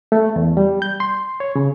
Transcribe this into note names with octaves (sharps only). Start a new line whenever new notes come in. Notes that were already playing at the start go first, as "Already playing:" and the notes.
A3
E2
G3
G6
C6
C#5
C#3